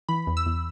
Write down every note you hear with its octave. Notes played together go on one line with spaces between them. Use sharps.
E3 B5
E2
E6
E2